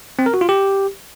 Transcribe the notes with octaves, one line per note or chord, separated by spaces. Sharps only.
C4
A#4
F#4
F4
G4